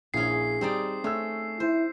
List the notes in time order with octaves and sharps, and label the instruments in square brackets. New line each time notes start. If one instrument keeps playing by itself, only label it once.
[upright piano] A#1 A#2 E4 [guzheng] C#4 G#4 [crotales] C7
[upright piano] G3 [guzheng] C4 D#4 D5
[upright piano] A3 E6 [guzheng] C#4
[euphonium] E4 [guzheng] C5